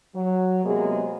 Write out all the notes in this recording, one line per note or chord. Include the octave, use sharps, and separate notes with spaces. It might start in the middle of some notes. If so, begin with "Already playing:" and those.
F#3
C3 F#3 G#3 A#3 B3 G#4